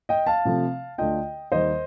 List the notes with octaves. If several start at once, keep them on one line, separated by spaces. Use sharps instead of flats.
D#5 G5
F5 A5
C3 F3 A3
D2 D3 A3 D4 F4 D#5 G5
D#2 D#3 G3 C5 D#5